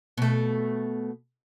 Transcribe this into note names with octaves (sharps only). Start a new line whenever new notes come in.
B2 A3